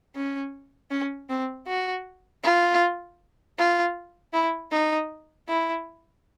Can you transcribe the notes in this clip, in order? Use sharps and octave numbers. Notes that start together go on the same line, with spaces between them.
C#4
C#4
C4
F#4
F4
F4
E4
D#4
E4